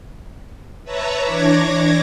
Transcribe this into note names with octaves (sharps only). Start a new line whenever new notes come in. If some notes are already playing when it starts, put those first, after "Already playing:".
B4 C#5 E5 A5 A#5
E3 D4 C#5 D6 G#6 A#6